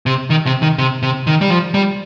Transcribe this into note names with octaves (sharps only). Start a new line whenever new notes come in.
C3
D#3
C3
D#3
C3
C3
D#3
G3
F3
G3